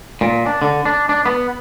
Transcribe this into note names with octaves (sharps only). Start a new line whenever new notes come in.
A#2
D4
D3
D4
D4
B3